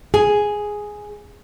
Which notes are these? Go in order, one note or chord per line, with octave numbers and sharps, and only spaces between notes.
G#4